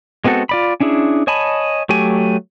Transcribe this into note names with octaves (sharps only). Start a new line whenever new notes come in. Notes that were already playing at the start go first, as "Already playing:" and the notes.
G#3 B3 C4 F#4 A4
F4 D5 B5
C#4 D4 E4 G#4
C#5 D#5 G#5 A5 B5
F#3 A3 G4 G#5